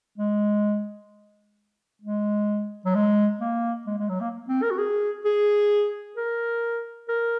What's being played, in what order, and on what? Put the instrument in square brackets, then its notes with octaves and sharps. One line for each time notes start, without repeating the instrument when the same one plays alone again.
[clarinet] G#3
G#3
F#3
G#3
A#3
G#3
G#3
F#3
A#3
C4
A#4
F#4
G#4
G#4
A#4
A#4